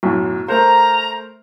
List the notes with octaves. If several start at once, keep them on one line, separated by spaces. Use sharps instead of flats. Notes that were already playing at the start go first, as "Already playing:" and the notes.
B1 F#2 A2
A3 A#4 C5 A#5